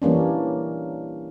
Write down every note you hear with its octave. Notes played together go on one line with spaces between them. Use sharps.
E3 G3 A#3 C#4 D4